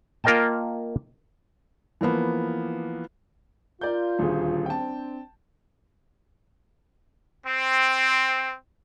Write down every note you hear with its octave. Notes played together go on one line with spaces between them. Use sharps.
A#3 F4 A#4 D#5 G5 A5
E3 F3 A#3 B3
F4 A#4 D5 G6
D#1 D2 G#4
C4 D4 G5 A5
C4